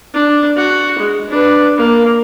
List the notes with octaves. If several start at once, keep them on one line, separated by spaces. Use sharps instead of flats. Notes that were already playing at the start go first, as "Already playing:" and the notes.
D4
F#4
G#3
D4 B4
A#3